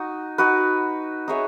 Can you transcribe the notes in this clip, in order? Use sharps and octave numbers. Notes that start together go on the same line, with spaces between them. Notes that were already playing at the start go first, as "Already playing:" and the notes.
Already playing: D#4 F#4
D#4 F#4 B4
D#4 G#4 C#5 E5